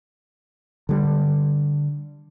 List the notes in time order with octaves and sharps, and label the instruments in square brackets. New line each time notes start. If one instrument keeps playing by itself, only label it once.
[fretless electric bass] D3 G3